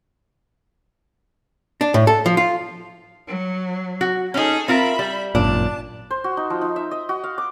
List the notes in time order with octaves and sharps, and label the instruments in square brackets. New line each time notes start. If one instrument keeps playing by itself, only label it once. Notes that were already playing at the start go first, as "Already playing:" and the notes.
[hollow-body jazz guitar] D4
A2
A4
F3
F4
[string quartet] F#3
[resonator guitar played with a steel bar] F#4
[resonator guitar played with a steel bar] C#4 D#4 [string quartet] G#4 A4
[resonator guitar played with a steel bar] C4 F4 A#4 [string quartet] E5 B5
[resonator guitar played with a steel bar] G3
[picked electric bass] G#1 F#2 A#2 [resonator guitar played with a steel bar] D4 [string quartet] A5
[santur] C5
F#4
D#4
F3
D#4
E5
D#5
F#4
F5
D6